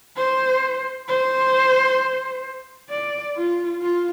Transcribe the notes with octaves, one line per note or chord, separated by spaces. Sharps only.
C5
C5
D5
F4
F4